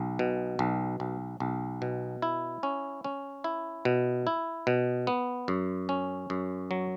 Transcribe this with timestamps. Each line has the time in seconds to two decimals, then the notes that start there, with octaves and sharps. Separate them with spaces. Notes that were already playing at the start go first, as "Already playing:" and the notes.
Already playing: B1
0.19 B2
0.59 B1
1.00 B1
1.40 B1
1.82 B2
2.22 E4
2.63 C#4
3.04 C#4
3.44 E4
3.85 B2
4.27 E4
4.67 B2
5.07 B3
5.48 F#2
5.89 C#4
6.30 F#2
6.71 F#3